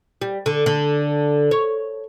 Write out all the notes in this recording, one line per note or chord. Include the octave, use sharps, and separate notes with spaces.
G3
D3
D3
C#5